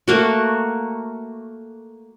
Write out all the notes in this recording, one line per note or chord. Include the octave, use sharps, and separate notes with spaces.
A3 A#3 F#4